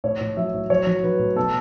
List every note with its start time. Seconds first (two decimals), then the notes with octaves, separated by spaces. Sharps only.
0.04 A2 C#5
0.21 A2
0.37 F#3 E5
0.54 A2
0.70 F#3 C#5
0.87 F#3
1.03 F#3 B4
1.19 A2
1.36 B2 A4